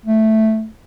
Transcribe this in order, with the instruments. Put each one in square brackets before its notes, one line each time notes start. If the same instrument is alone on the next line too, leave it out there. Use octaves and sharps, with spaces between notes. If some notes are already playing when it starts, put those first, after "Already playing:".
[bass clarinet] A3